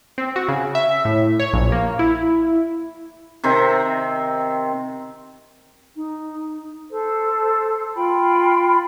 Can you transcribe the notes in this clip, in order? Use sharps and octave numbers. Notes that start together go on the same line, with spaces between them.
C4
F#4
C#3
E5
A2
C#5
A#1
A#3
E4
C3 D#3 C4
D#4
A4 C5
F4 G5 B5